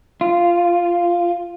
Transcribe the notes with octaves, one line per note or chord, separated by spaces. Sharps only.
F4